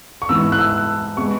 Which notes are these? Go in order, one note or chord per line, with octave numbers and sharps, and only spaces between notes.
C#6
G#2 E3 B3 E6
F#6
E6
G#3 B3 C#6